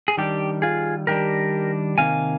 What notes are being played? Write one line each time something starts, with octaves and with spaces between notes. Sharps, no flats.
G#4
D#3 G3 D4 G4
F4 G#4
D#3 G3 D4 G4 A#4
C3 D#3 A#3 F5 G#5